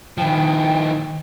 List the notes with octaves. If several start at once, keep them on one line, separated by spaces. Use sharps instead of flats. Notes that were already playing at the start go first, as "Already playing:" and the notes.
D#3 F3 G5